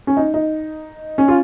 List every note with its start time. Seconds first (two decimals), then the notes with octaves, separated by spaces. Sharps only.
0.07 C#4
0.17 D#4
0.34 D#4
1.18 C#4
1.28 F4